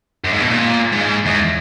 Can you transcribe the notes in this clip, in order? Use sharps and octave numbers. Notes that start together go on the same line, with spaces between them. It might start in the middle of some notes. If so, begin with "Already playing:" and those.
F#2
G#2
B2
A#2
G#2
E2